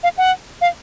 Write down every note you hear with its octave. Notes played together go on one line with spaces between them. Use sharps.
F5
F#5
F5